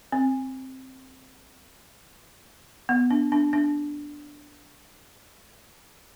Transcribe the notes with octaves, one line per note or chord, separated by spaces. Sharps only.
C4
B3
D4
D4
D4